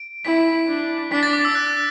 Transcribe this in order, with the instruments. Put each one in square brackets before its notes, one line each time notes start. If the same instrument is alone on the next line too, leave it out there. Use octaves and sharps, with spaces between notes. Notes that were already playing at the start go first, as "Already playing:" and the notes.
Already playing: [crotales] D7
[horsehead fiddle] E4 [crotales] B6
[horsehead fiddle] D4
[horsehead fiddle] D4 [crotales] B6
[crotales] A6
D6
E6
F#6